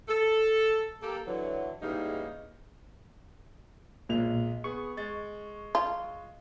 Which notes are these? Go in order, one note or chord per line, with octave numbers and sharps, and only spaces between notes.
A4
A#3 G4 A4
D3 E3 F#3
G#2 C#3 E3 G3 A#3 D#4
B1 A#2 G#3 F7
B3 G#4 C#6
G#3 A6
F4